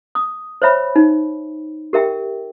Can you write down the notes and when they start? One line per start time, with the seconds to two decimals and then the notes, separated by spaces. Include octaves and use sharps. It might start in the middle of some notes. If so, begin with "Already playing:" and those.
0.15 D#6
0.62 C5 C#5 E5 B5
0.96 D#4
1.93 G4 A#4 E5 G5